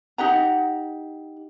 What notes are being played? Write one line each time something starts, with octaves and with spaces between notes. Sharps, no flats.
D#4 G4 F#5 A#5